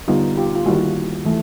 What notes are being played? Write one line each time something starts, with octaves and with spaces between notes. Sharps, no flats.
D3 G3 B3 D#4 F4
F4 G4
F4
D#3 G3 A#3 E4 F#4
E3 A3